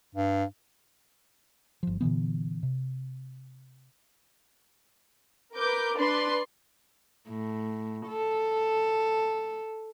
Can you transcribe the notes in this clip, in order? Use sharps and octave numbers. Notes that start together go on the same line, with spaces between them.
G2
G1 F3
A#2 D3 E3 B3
C3
A#4 B4 D6 G6
D4 B4 D5 C6
A2
A4